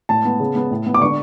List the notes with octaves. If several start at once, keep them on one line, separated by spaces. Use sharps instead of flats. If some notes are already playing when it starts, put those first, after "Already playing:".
A2 A5
B3
C#3
B3
A2
B3
D6
D3 C#6